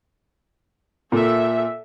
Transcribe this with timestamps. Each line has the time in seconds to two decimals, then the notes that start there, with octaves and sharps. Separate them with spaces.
1.12 A#2 A4 E5